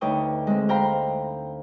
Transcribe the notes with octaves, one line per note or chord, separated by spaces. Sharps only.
D2 D#4 B4 C#5 G5 D#6
G#3 C4
C5 F5 G5 A#5 B5